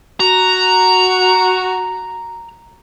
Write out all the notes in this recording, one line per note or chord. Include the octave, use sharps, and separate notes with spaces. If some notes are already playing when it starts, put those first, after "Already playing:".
F#4 A#5